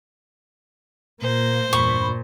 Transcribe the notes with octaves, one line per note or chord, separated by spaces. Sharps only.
A#2 A#3 C5
E2 G2 A#2 B5 C#6